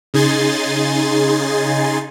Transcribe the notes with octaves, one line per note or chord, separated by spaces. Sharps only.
C#3 D#4 G#4 G#5 C6 A6